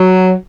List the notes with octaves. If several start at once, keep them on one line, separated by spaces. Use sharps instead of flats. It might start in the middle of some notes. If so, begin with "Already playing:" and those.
Already playing: F#3